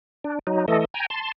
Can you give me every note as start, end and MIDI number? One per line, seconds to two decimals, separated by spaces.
0.24 0.39 62
0.47 0.66 54
0.47 0.66 63
0.68 0.85 52
0.68 0.85 57
0.68 0.85 69
0.68 0.85 75
0.94 1.06 79
0.94 1.06 80
0.94 1.06 82
1.10 1.32 81
1.10 1.32 84